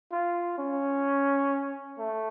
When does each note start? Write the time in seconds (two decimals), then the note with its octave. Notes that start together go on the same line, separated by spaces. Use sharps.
0.12 F4
0.58 C#4
1.98 A3